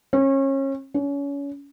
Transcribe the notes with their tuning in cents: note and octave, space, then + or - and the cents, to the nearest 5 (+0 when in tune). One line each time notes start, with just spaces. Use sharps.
C#4 -30
C#4 +30